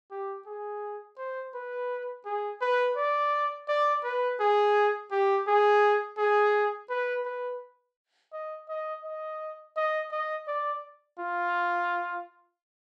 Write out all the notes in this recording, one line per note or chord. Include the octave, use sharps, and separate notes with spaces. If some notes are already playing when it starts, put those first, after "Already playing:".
G4
G#4
C5
B4
G#4
B4
D5
D5
B4
G#4
G4
G#4
G#4
B4
B4
D#5
D#5
D#5
D#5
D#5
D5
F4